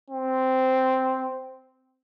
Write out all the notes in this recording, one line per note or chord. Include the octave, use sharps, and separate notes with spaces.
C4